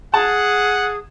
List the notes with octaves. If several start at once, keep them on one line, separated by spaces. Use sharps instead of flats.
G#4 F#5 A5